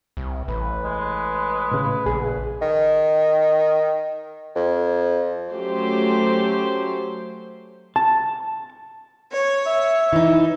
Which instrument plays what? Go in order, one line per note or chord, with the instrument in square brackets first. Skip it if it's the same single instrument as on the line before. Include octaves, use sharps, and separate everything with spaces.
[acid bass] C2
[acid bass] A1 [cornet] B4
[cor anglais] G#3
[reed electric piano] A2 C#3 [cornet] B4
[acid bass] A#1 [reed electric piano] G#4
[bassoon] D#3
F2
[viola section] F#3 A3 C#4 G4 C5
[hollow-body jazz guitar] A5
[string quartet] C#5
[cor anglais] E5
[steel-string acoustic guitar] E3 D#4